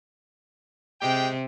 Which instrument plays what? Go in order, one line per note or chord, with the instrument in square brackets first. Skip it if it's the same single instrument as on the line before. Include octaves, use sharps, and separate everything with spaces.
[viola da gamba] C3 [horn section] G#3 G4 G5